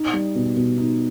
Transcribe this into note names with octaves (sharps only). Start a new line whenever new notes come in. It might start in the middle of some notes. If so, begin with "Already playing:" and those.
Already playing: D#4
G3
B2
B2
D#4